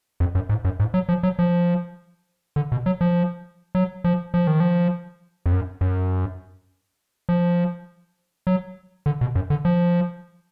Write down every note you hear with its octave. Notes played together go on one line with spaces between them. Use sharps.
F2
F#2
G#2
F#2
G#2
F#3
F3
F#3
F3
D3
B2
F#3
F3
F#3
F3
F3
D#3
F3
F2
F#2
F#2
F3
F#3
D3
B2
F#2
D3
F3